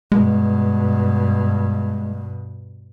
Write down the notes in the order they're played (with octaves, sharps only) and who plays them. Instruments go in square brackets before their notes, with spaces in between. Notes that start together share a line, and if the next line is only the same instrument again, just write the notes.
[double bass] G2 B2 [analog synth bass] G#3